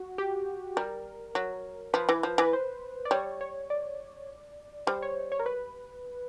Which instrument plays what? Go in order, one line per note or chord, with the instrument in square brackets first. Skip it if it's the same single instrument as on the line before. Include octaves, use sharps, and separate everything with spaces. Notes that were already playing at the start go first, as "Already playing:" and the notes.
Already playing: [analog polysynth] F#4
G4
[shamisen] G3 [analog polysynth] A#4
[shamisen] F#3
[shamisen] F3 [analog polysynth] B4
[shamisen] E3
F3
[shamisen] E3 [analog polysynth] B4
[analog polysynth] C5
D5
[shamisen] G3 [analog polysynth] C#5
[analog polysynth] C#5
D5
[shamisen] G3 [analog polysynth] C5
[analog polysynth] C#5
C#5
A#4
B4